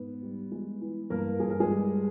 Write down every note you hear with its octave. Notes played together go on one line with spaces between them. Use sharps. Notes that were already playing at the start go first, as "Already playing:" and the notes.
Already playing: G#2 B3
G3
G#3
E3
G2 A#3 A#4
G2 G#4
A#4
G#3 G#4
G3